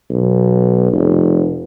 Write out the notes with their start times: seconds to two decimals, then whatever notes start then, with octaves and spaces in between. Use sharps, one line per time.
0.10 B1
0.93 F1